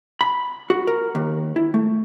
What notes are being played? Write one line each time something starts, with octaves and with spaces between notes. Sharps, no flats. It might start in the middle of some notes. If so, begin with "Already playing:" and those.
B5
F#4
A#4
D#2
E4
A3